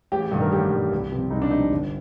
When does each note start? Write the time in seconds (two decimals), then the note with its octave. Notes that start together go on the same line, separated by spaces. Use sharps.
0.12 A1 G4
0.22 G4
0.32 G2 D#3 A4
0.41 A#4
0.52 A1 G4
0.71 G2 D#3
0.91 C2
1.12 C3 F3
1.31 C2 D#4
1.42 D4
1.51 C3 F3 D#4
1.71 G1